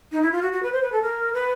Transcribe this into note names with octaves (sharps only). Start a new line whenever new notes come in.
D#4
E4
F4
F#4
F#4
B4
C5
B4
A4
A#4
B4